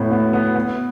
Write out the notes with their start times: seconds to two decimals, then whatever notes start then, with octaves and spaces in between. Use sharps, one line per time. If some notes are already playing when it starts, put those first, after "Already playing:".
Already playing: A2 B3
0.11 B3
0.33 B3
0.55 B3